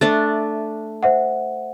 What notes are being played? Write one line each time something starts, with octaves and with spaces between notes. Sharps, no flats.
A3 D4 D5 E5 A6
C5 E5 F#5